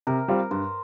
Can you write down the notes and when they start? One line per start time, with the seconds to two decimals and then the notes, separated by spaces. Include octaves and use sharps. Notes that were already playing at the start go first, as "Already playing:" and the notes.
0.07 C3 A#4
0.28 G3 C4 F4
0.51 G2 C5